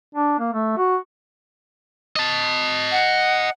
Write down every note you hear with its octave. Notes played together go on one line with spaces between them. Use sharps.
D4
A#3
A3
F#4
D#5 A5
F#5